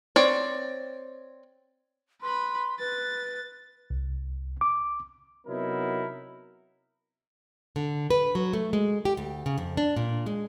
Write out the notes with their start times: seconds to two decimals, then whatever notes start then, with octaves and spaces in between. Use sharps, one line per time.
0.16 C4 C#5 D5
2.22 B4 B5 C6
2.80 B4 A6
3.90 C2
4.61 D6
5.47 C3 F#3 B3 D#4 E4 A#4
7.76 D3
8.10 B4
8.35 F#3
8.53 A3
8.73 G#3
9.05 G4
9.17 D2
9.46 C#3
9.58 F2
9.77 D4
9.96 A#2
10.26 G#3